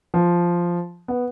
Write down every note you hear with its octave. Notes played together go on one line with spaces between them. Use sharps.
F3
B3